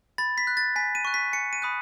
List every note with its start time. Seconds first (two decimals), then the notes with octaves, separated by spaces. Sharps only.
0.18 B5 A6
0.38 B6
0.47 F#6
0.57 A6
0.76 G#5 B6
0.95 D#7
1.05 C#6 F#6
1.14 B6
1.33 G#5 C#7
1.53 D#7
1.62 B5 D#6 F#6